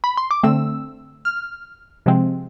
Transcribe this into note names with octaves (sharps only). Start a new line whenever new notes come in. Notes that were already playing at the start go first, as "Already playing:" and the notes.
B5
C6
D6
D3 A3 C4 E6
F6
C3 F3 G#3 C4